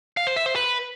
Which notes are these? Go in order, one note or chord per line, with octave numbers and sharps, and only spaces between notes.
F5
C5
E5
C5
B4